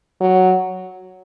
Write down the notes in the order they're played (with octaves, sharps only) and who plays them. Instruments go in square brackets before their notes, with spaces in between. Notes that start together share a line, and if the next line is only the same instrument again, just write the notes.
[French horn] F#3